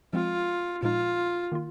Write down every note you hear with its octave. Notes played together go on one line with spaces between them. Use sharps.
F3 G#3 C4 F4
A#2 F3 G#3 D#4 F4
D#3 A#3 F4